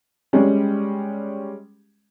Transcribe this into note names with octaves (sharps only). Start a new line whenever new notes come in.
G3 G#3 C#4